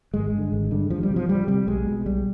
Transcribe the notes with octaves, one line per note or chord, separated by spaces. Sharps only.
G#1 G#3
G2
D3
G#1
G2 D3
D2 F3
G3
C3
F3
D2 G3
C3 G3
B1 G#3
B2
B1 G3